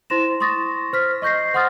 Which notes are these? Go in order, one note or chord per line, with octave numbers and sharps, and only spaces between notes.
E4 C5 C6 A#6 E7
C6 C#6 D#6 A6 A#6
C5 F6 B6
D#5 C#6 G6 A#6 C7
C5 F#5 C6 D#6 F6 A6